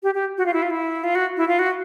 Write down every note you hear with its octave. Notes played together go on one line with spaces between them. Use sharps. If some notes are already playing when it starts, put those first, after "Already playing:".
G4
G4
F#4
F4
E4
F4
E4
F4
F#4
E4
F4
F#4